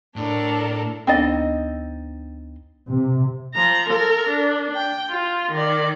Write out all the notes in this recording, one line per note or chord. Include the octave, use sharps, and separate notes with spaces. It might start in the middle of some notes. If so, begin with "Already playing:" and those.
A2 D4 A4 A#4
D2 B3 C4 D4 D#4 D#5 G5 A6
C3
F3 A#5
A4 A#4
D4
G5
F4
D#3 D5